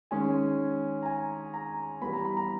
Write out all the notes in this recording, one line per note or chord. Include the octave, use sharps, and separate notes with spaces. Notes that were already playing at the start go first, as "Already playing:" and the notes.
D#3 G#3 C#4 G#5
A#5
G#5
A#5
E3 G3 B3 B5
A#5
B5
A#5